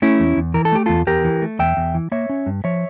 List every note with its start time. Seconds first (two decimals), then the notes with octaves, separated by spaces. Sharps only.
0.02 A3 C#4 E4
0.20 E2
0.37 E2
0.54 E3 A#4
0.65 A4
0.72 A3 G4
0.86 E2 F4 A4
1.07 E2 G4 A#4
1.24 E3
1.42 A3
1.59 E2 E5 G5
1.77 E2
1.94 E3
2.12 A#3 C#5 E5
2.29 C#4
2.46 G2
2.64 F3 C#5 E5